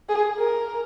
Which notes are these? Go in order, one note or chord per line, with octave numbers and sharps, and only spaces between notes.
G#4
A#4